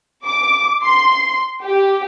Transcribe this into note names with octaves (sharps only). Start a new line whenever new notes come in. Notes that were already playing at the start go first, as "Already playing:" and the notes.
D6
C6
G4